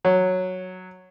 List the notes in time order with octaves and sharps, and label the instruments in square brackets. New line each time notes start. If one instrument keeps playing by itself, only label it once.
[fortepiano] F#3